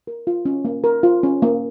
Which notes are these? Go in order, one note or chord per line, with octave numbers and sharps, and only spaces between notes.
A#4
F4
C#4
A#3
A#4
F4
C#4
A#3